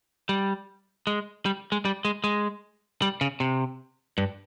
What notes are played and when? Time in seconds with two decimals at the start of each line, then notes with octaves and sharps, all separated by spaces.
0.29 G3
1.07 G#3
1.46 G3
1.72 G#3
1.85 G3
2.05 G#3
2.24 G#3
3.02 G3
3.21 C#3
3.40 C3
4.18 G2